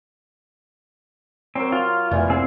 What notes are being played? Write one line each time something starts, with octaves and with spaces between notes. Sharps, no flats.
F#3 C4 A#4
F4
F1 A#2 E3 B3
C4 G#4